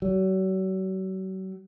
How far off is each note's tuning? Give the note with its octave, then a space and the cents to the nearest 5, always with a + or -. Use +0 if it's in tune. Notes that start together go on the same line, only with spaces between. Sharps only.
F#3 +40